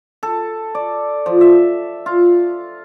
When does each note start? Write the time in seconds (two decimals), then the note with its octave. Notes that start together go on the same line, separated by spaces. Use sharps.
0.23 A4
0.75 D5
1.26 F3
1.41 E5
2.06 F4